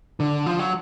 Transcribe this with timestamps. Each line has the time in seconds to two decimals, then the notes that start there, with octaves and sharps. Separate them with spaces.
0.20 D3
0.46 F3
0.59 F#3